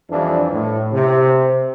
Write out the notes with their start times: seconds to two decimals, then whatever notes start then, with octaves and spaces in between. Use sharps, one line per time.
0.11 F2 E3 G3 D4
0.53 A2
0.93 C3